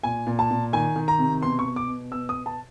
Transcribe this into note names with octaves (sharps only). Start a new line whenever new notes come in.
A#2 G#5
A#2
A5
A#2
D#3 G#5
D#3
A#5
C3
B2 C6
C#6
B2
D6
B2
B2 E6
D#6
B2
A5